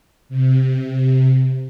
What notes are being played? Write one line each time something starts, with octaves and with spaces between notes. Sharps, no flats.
C3